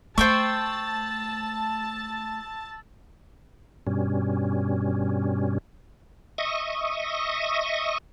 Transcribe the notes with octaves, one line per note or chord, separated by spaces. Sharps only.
A3 C5 G5 A5 C#6 E6 A6
G2 B2 G3 C#4
D#5 E5 C#6 D#6